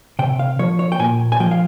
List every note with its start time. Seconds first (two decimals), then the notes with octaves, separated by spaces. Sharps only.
0.19 C3 G5
0.39 F5
0.59 F3 C#5
0.79 C#5
0.92 G5
0.99 A#2 G#5
1.32 G#5
1.40 F3 G5
1.51 F5